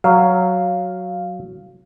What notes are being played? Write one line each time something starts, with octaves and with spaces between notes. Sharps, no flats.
F#3 F5